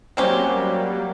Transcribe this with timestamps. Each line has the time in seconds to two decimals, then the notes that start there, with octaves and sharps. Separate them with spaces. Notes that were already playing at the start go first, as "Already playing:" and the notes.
0.17 F#3 G3 A#3 C4 C#4 G4